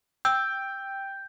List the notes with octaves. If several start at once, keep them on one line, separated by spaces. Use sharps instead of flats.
G5 E6 G6